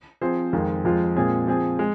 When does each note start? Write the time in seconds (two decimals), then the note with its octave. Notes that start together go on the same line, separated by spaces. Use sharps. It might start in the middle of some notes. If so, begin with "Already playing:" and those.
0.21 F3 C4 G#4 C5
0.53 F2 D#3 G#3 F4
0.84 F2 F3 G#3 F4
1.16 A#2 G#3 C4 G#4
1.47 F3 C4 G#4
1.79 G#3